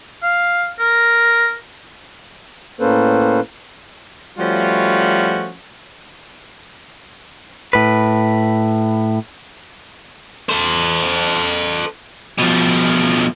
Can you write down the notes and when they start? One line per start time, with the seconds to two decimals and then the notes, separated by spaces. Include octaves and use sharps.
0.23 F5
0.79 A#4
2.80 A2 A#3 C#4 A4 B4 C5
4.38 F3 G3 A3 C#4 F4 F#4
7.73 A2 B4
10.49 A4 C5
12.38 B2 F3